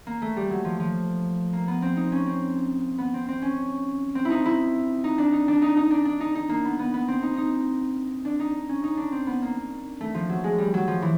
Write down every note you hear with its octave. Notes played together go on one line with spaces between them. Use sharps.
A#3
A3
G3
F#3
F3
F3
A#3
B3
C4
D#4
C#4
C4
B3
C4
C4
C#4
C4
E4
D#4
E4
D#4
D4
D#4
D4
D#4
D#4
D4
D4
D#4
D#4
A#3
B3
B3
B3
C4
D#4
D#4
D4
D#4
C#4
D#4
D4
C4
B3
A#3
A3
F3
F#3
G#3
G3
F#3
F3
E3